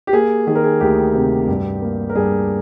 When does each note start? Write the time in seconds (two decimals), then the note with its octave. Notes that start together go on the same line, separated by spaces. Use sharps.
0.07 G4
0.13 A#3 G#4
0.47 D#3 G#4
0.55 A#4
0.64 G#4
0.80 D2 G4
1.15 C3
1.48 G2
1.82 A#3
2.09 A#4
2.15 G2 G#4